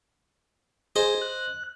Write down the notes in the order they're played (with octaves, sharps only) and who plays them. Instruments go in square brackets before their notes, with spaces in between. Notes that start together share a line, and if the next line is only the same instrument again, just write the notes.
[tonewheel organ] G#4 [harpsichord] C5 D#5
[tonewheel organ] F#6